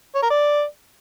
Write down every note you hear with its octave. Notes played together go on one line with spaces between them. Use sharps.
C#5
A#4
D5